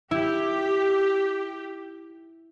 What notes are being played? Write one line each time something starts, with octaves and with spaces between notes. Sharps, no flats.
E4 G4